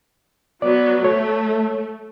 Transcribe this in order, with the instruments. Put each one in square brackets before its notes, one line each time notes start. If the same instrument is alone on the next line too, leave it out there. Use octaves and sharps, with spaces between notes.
[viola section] F#3 B3 [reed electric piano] D5
[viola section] A3 [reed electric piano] C#5